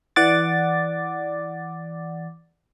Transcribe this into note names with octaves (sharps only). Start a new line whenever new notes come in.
E3 D5 F#5 D6 A6